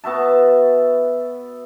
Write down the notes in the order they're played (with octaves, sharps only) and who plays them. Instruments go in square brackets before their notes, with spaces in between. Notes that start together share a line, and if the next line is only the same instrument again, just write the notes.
[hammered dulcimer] B3 F#4 E5 A5